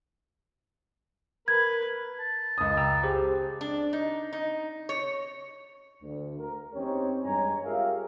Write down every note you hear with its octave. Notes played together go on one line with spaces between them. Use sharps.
A#4 B4 G#6
A5
C#2 D#6
G5 A#5 E6
G4 G#4 C5
D4
D#4
D#4
C#5
D2
A#4
E2 C4 C#4 D#4 G4 C#5
G2 G#3 C#5 G#5 A#5
F4 G4 G#4 A#4 E5 F5